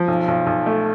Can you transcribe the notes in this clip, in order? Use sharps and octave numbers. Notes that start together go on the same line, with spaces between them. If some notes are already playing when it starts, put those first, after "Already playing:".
Already playing: F3
B1
B1
B1
A3